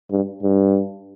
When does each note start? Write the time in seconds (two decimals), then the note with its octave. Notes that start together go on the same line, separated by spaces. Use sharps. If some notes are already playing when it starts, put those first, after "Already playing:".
0.11 G2
0.43 G2